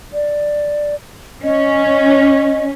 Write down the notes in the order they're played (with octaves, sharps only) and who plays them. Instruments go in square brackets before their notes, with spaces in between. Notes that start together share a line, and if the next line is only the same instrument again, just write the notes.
[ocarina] D5
[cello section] C#4 [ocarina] D#5